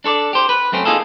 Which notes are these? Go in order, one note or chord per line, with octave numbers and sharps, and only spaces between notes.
D4 A4 C#5 D5
G4 C5
B4
F#2 A3 C4 C#4
A#3 D#4 F4 G#4 A4